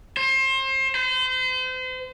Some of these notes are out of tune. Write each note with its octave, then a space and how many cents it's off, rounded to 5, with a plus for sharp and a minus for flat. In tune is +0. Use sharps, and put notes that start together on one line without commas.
C5 +30
C5 -35